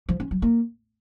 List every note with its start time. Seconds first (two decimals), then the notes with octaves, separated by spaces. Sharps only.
0.09 F3
0.20 C#4
0.31 F#3
0.42 A#3